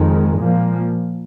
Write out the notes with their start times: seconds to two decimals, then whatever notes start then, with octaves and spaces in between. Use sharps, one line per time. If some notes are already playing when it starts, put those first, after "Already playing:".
Already playing: F2 D#3 G#3
0.38 A#2 F3 A#3